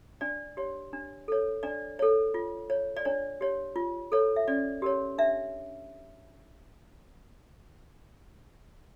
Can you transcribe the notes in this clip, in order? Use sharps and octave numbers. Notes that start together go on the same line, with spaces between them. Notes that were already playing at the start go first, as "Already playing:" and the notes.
D4 D5
G4 C#5
D4
A4 C#5
D4 D5
A4 C#5
F4
C#5
D5
D4 C#5
G4 C#5
F4
A4 C#5
E5
C#4 D5
G4 A#4 C#5
D4 E5